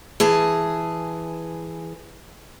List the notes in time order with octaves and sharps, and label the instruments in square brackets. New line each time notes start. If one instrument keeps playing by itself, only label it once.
[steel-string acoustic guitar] E3 G#4 A5